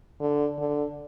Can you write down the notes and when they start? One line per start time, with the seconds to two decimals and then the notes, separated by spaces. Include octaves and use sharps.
0.20 D3
0.58 D3